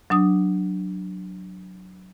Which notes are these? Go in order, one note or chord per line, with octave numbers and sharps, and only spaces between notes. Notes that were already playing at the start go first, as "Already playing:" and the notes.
F#3 D4 D#6